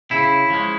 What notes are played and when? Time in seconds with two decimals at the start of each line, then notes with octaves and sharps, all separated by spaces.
0.11 C#3 E4
0.50 F3 G#3 C#4